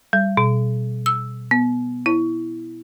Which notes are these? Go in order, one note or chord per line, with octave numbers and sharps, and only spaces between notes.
G3
B2
E6
B3
E4